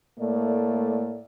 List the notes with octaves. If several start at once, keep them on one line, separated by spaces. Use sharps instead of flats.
A2 A3 A#3 D5